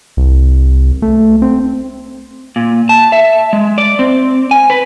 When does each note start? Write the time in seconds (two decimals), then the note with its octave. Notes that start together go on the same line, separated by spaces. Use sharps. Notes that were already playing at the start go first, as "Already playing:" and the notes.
0.17 C2
1.02 A3
1.42 C4
2.56 A#2
2.89 A5
3.12 E5
3.53 G#3
3.78 D5
3.99 C4
4.51 G#5
4.70 B4